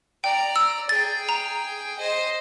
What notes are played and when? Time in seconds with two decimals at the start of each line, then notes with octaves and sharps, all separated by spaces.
0.24 D5 G5 A#5
0.56 E6
0.89 G#4 G5 A6
1.29 A#5
1.99 C5 D#5